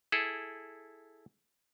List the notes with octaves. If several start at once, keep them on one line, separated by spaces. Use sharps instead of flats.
E4 G#4 A4